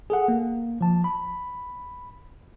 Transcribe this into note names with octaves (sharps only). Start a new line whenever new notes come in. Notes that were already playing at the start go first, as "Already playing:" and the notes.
G#4 A4 F#5
A#3
F3 A5
B5